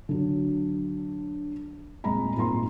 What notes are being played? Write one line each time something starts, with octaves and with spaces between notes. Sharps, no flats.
D3 F#3
D#1 G#3 C4 G#4 A#5 B5
G#1 A#2 C4 A#5 C6